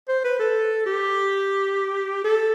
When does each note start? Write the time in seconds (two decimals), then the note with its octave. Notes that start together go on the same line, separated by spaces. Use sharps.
0.08 C5
0.24 B4
0.39 A4
0.86 G4
2.24 A4